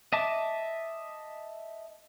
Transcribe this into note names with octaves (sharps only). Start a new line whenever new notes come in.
D#5 E5 A5 D6